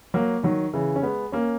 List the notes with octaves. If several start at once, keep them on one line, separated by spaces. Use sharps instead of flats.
F#3 A#3
D#3 F#3
C#3 E3
C#4
G#3 B3
A#3 C#4